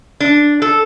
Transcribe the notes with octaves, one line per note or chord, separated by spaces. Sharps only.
D4
A4